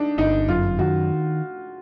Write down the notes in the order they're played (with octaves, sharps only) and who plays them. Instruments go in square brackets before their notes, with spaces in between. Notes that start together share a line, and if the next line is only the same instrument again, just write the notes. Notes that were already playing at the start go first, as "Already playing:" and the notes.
Already playing: [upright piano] D4 D#4
[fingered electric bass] G1 [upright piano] D#4
[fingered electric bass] F#2 [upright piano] F4
[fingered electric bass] D#3 [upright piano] F#4